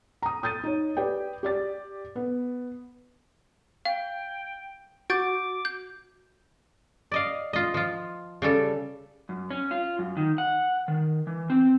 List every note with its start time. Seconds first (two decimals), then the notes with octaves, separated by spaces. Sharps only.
0.22 A#5 D#6
0.43 D#6 G6 A6 D#7
0.64 D#4 C#5
0.97 G4 B4 D5 G5
1.43 G4 D5 A6
2.16 B3
3.85 F5 G5
5.10 F#4 D6 G6 A6 D7
5.65 G6
7.11 D5 D#5 F5
7.53 F4 D#5
7.74 F3 F4
8.42 C#3 G3 A4
9.29 F#2
9.51 C#4
9.71 F4
9.99 F#2
10.17 D#3
10.38 F#5
10.88 D#3
11.27 E3
11.50 C4